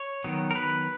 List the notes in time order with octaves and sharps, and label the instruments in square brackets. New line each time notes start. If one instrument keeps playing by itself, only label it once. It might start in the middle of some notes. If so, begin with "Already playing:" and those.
Already playing: [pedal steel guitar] C#5
D#3 F#3 B3
A#4
B4